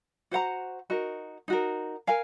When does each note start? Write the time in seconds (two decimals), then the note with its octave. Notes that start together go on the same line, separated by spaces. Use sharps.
0.31 F#4 C5 F#5 A#5
0.90 D#4 F#4 A#4
1.48 D#4 F#4 A#4
2.07 A#4 F5 G#5